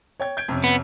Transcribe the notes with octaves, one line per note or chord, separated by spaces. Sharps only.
C#5 G5 G#6
G6 G#6 D7
F2 C3 C#4
B3